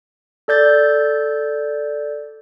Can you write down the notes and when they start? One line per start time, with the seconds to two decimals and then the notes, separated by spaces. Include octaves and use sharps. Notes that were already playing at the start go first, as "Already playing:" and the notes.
0.48 A4 D5 G6 A6